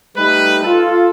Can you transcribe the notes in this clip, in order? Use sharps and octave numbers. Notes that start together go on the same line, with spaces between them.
G3 A3 D#4 B4
F4 A4